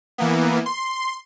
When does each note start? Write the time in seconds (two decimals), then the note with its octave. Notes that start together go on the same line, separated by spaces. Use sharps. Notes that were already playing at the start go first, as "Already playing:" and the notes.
0.18 E3 A#3 B3
0.66 C6